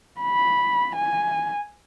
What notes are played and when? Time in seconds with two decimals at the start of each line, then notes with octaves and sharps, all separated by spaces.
0.21 B5
0.96 G#5